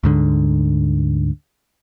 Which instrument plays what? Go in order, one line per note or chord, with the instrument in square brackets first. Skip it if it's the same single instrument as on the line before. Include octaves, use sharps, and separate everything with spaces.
[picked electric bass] D2 G#2 D3